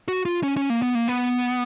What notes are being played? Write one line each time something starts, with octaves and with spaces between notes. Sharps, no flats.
F#4
F4
C#4
C#4
A#3
B3
A#3
B3